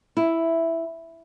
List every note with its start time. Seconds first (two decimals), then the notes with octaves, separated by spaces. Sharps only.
0.17 E4